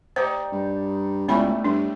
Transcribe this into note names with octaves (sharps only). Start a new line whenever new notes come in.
D#4 G4 C5 D5
G2
C#2 A2 G3 A3 B3 E4 B5
G2 D4